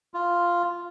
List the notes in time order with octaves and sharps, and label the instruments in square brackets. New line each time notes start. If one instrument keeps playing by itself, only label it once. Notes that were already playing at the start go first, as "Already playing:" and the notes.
[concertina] F4